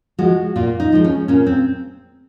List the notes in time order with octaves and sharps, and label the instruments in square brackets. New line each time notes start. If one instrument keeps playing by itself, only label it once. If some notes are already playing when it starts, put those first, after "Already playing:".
[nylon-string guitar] F3 G#3 F#4
A#2 F4
D#4
F3 G#3
C#4
A#2 C#4
C4